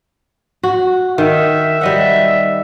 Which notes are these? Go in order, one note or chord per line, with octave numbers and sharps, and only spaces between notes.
F#4
D#3 E5
G3 D#5 F#5